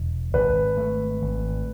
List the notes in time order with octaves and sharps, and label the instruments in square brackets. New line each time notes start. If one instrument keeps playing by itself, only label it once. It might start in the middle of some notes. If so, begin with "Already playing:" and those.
Already playing: [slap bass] E1
[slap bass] G#1 [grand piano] B4
[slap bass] A3
G#1